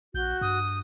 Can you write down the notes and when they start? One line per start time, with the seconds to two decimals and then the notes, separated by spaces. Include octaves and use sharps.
0.14 A#1 F#4 G6
0.41 G2 D#6